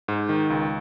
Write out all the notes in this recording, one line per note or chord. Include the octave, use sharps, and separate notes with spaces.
G#2
D#3
C#2